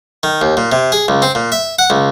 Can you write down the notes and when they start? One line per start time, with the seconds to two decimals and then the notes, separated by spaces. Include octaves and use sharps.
0.23 D#3
0.42 D#2
0.57 A#2
0.72 C3
0.92 G#4
1.08 C#2
1.22 C4
1.35 A#2
1.52 E5
1.79 F#5
1.90 C#2